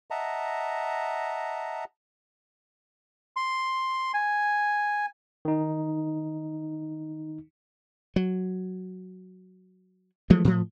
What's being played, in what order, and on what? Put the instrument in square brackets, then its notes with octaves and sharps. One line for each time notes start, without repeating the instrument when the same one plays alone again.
[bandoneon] D#5 E5 F#5 A5 A#5
[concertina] C6
G#5
[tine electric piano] D#3 D#4
[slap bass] F#3
E3 F3 G#3 A3
A2 F3